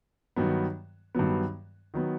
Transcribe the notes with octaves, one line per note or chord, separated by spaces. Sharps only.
G2 D#3 F#3 B3
G2 D#3 F#3 B3
D#3 F#3 B3